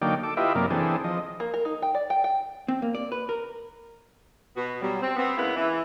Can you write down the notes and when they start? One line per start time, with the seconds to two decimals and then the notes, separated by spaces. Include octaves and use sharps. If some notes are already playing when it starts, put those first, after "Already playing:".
0.02 D3 F#3 A#3 D#4 D5 G5
0.23 A4 D6
0.37 E4 F4 G4 B4 D#5 E5
0.55 F#2 C3 A#3 A#4 D5
0.70 E3 C4 D4 G#4 A4
1.04 F3 D#5
1.40 A#3
1.54 A#4
1.65 D#4
1.82 G5
1.95 D5
2.10 G5
2.24 G5
2.68 C4
2.82 A#3
2.95 D5
3.12 B4
3.29 A#4
4.56 B2 B3 F#4
4.82 B2 F#3 G3
5.01 C4
5.17 B3 C4
5.37 C#3 G#3 A#3 B3 E4 G#4
5.55 E3